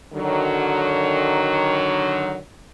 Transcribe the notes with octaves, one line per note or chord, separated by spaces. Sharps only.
D3 D#3 F#3